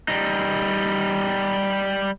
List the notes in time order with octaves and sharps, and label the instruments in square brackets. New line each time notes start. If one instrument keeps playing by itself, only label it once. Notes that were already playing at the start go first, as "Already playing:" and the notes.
[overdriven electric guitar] G3 D#4